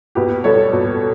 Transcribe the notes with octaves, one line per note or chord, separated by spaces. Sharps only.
B2 G4 B4
G3 A4 C#5
B2